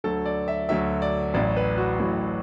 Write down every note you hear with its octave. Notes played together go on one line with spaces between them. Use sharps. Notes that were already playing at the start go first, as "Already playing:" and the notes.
D2 D3 F#3 A4
D5
E5
D2 D3 F#3 E5
D5
A1 A2 F#3 D5
B4
F#4
A1 A2 F#3 F#4